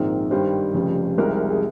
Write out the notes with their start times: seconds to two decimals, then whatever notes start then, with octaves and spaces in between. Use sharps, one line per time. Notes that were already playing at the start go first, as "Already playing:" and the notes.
Already playing: A#1 G#2 D#3 G#3 C4 A#4
0.31 G2 D#3 G3 C5
0.74 F1 F2 C#3 G3
1.18 C2 C3 F3 G#3 D#4 A#4
1.50 G#4